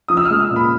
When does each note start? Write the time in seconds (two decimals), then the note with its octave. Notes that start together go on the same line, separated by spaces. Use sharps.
0.08 F3 D#6
0.17 E6
0.25 F6
0.30 G#3
0.40 E6
0.51 A#2
0.56 B5